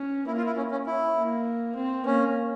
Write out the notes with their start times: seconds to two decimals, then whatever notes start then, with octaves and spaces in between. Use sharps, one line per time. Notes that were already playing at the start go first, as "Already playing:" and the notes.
Already playing: C#4
0.27 A#3 E4
0.37 F4
0.46 E4
0.57 C#4
0.71 C#4
0.86 E4
1.17 A#3
1.75 C4
2.06 A#3 C#4